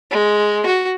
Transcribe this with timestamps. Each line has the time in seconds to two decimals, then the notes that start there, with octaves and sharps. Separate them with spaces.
0.11 G#3
0.66 F#4